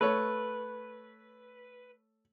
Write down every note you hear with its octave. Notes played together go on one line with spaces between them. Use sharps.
A3 B4 C#5